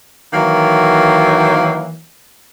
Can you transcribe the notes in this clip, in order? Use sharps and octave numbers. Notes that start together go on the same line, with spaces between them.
D#3 E3 F#3 A#3